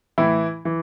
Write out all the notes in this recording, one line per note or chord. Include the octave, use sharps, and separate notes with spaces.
A2 E3 E4
E3